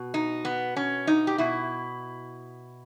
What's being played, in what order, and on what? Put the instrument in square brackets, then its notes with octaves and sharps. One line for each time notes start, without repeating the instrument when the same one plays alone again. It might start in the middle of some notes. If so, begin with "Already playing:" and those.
Already playing: [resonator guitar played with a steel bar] B2
D#4
B3
C#4
D#4
G4
B2 E4